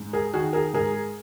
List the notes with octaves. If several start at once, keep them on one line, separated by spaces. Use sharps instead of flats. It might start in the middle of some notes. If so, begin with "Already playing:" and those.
Already playing: G#2
G#4 A#4
D#3 F#4 G#4
G#4 A#4
G#2 G#4 A#4